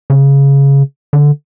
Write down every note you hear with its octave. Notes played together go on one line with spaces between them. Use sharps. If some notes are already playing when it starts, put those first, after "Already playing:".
C#3
D3